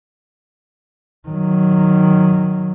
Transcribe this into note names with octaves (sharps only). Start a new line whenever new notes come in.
D#3 F#3